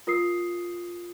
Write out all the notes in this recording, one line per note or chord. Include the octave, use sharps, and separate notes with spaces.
F4 A#4 D#6 C7